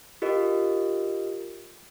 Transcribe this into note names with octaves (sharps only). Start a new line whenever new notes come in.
F4 G4 A#4 D#5